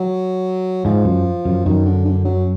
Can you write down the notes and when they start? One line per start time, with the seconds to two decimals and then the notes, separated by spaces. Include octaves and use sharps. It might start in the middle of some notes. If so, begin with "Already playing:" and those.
Already playing: F#3
0.85 G#2 F3
1.05 F#2
1.45 F#2
1.65 F#2 D#3
1.86 D3
2.05 D3
2.25 F#3